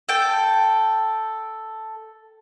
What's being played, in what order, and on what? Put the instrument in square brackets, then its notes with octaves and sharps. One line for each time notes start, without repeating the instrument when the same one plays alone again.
[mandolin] A4 G5